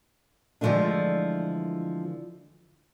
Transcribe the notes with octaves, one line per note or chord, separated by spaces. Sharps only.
D3 E3 F3 G#3 A3 D4